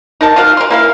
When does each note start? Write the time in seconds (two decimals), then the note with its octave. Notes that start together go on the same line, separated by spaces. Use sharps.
0.21 D#4 A#4 A5
0.36 F4 F#4 A#4 F5
0.57 A#4 C6
0.71 A#3 E4 F5